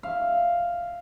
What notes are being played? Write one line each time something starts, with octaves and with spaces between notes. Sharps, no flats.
E5 F5